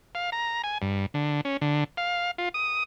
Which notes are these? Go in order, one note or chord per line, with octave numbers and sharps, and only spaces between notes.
F5
A#5
G#5
G2
D3
C#4
D3
F5
F4
D#6